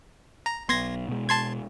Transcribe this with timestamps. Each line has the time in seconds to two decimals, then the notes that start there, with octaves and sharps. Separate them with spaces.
0.46 A#5
0.69 B1 B3 C6 G#6 A#6
1.09 B2 G#3
1.29 A5 C6 G#6